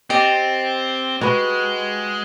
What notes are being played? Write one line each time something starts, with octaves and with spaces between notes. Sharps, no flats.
C4 G4 D5 D#5
G#3 F#4 B4